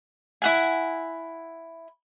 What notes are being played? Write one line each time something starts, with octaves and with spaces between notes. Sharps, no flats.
E4 F#5 G#5